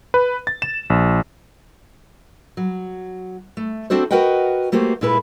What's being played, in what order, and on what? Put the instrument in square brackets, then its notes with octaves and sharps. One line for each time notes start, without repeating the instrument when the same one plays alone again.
[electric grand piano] B4
A6
E7
A#1
[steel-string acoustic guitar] F#3
A3
C4 D4 F#4 A4 C5
F#4 A#4 B4 D#5 F#5 G5
A3 A#3 F#4 G4 C5
A#2 G#3 E4 A4 B4